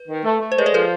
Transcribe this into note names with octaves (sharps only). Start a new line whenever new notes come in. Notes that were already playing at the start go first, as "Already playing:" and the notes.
Already playing: B4
D#3
A3
A3
C5
G#3 B4 C#5
C5 D5
F3 A4 B4